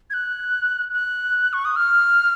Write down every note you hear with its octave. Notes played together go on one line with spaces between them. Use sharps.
G#6
F#6
F#6
C#6
D#6
F6